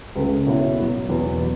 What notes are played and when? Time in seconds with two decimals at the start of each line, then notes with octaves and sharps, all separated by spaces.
0.16 C#2 C#3 A3 C#4 B4
0.47 B2 B3 E4 C#5
0.78 B2 F#3 B3 E4
1.09 E2 B2 F#3 B3 B4
1.41 B2